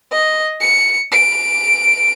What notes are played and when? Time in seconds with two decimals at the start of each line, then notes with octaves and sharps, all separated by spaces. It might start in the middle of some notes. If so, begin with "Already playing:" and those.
0.12 D#5
0.60 C#7
1.12 D7